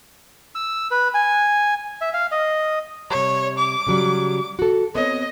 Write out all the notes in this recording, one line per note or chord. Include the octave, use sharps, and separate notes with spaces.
E6
B4
G#5
E5
F5
D#5
C3 G3 C#5
D6
C#3 F#3 G3
F#4 A4
B3 C4 C#5 D#5